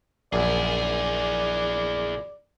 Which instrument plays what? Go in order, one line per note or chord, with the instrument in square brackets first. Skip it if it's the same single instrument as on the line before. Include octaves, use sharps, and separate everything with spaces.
[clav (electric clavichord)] A#1 F#2 [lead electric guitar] E4 G#4 [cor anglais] D5